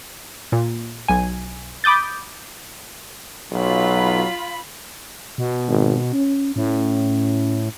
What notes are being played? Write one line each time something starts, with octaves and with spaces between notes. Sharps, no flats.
A#2
B1 G#5
B5 D6 D#6 G6 A6
B1 F#3 F4 B5
B2
G#1
C#4
A2 C#4